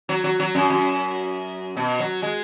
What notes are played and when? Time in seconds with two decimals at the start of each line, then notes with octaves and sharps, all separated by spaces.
0.09 F#3
0.24 F#3
0.39 F#3
0.55 F#2
0.70 F#2
1.77 B2
2.00 F#3
2.22 G#3